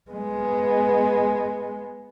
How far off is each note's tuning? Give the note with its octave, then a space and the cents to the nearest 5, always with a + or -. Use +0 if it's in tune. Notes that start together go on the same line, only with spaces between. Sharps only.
G#3 +0 B3 +0